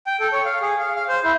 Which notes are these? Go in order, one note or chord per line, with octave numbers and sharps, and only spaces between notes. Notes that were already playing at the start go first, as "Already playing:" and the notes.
G5
A4
C#5
F5
G#4
F5
F5
C5
E4